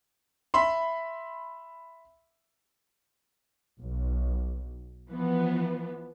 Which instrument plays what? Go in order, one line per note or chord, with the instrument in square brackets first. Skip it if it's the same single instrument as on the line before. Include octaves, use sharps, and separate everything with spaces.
[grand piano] E5 B5 C6
[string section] B1
E3 F3 B3